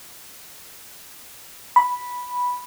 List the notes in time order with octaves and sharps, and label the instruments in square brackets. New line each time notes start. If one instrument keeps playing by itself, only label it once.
[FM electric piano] B5